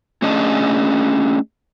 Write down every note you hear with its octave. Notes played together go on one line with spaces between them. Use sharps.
A3 C#4 D4 G#4 D#5 A5